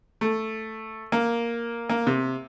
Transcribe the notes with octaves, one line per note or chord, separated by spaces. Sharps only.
A3
A#3
A#3
C3